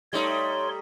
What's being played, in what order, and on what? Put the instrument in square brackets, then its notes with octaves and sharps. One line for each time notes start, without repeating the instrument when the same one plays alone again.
[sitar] G3 A3 D#4 [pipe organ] C#5 C6